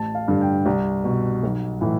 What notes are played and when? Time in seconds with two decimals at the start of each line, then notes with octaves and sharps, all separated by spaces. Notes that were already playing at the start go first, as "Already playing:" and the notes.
Already playing: A1 A5
0.15 F5
0.28 G2 D3
0.41 G5
0.66 C2
1.04 B2
1.43 B1
1.81 A2 E3